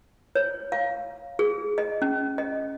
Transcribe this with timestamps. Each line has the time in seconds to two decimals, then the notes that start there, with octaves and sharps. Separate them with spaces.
0.35 C#5
0.72 F5
1.39 G#4
1.78 D#5
2.02 C#4
2.38 D#5